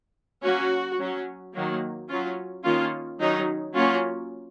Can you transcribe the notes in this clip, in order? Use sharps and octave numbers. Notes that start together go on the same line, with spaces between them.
F#3 A#3 C#4 F#4
F#3 C#4
D#3 F#3 A#3
F#3 C#4 F4
D#3 A#3 C#4 F4
D#3 F#3 C#4 D#4
F#3 A#3 C#4 F4